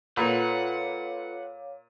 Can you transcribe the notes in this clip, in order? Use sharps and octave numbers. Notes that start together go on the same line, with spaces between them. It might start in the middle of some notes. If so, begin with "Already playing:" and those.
A#2 F4 A4 B4 C#5 F5 F#5 D6